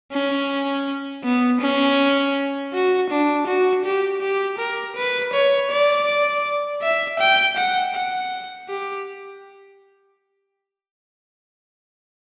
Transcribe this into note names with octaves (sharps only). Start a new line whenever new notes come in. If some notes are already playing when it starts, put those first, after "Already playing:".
C#4
B3
C#4
F#4
D4
F#4
G4
G4
A#4
B4
C#5
D5
E5
G5
F#5
F#5
G4